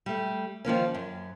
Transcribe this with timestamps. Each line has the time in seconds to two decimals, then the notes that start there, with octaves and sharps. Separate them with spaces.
0.06 G3 A3
0.65 D#3 F3 A#3 C#4
0.94 F#2